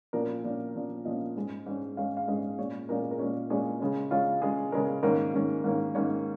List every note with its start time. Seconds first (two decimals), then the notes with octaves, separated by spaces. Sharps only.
0.13 A#2 F3 C#4 A#4
0.44 A#2 F3 C#4
0.75 A#2 F3 C#4
1.05 A#2 F3 C#4 D#5
1.36 G#2 G#3 C#4
1.66 G#2 G#3 C#4
1.97 G#2 G#3 C#4 F5
2.17 F5
2.28 G#2 G#3 C#4 D#5
2.58 A#2 G#3 C#4 C#5
2.89 A#2 G#3 C#4 A#4
3.00 G#4
3.11 A#4
3.19 A#2 G#3 C#4
3.50 A#2 G#3 C#4 G#4
3.80 C#3 G#3 C#4
4.11 C#3 G#3 C#4 F4
4.42 C#3 G#3 C#4 G#4
4.72 C#3 G#3 C#4 A#4
5.03 G#2 D#3 A#3 C#4 A#4
5.34 G#2 D#3 A#3 C#4
5.64 G#2 D#3 A#3 C#4
5.95 G#2 D#3 A#3 C#4 C#5